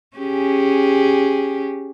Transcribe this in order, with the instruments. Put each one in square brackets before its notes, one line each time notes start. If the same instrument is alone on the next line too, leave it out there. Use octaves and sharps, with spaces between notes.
[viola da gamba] C#4 G4 G#4